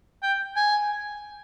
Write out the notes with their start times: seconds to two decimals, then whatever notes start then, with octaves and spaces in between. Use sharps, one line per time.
0.23 G5
0.56 G#5